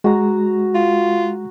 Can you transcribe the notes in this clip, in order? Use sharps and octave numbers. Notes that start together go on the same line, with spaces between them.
G#3 F#4 A#5
F4